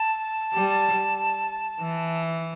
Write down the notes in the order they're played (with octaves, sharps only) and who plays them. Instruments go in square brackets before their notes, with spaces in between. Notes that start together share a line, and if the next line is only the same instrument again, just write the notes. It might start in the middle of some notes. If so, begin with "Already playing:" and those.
Already playing: [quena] A5
[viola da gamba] G3
E3